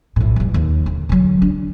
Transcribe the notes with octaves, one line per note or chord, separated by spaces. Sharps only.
A#1 A2
E2 G3
D#2
D3
D3 F#3
D4